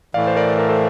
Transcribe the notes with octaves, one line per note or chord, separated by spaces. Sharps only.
A2 E3 A3 D5 F5
C5
A#4 D5
A#4 D5
A4 C5